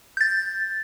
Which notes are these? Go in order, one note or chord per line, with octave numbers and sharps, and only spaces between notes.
G6 A6